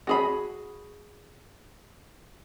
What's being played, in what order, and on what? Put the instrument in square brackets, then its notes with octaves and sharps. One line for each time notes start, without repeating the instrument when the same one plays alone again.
[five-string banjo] F#4 G#4 B5